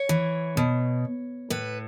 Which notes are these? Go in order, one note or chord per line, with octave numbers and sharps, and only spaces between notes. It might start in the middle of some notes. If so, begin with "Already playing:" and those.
Already playing: C#5
E3
B2
A2 B4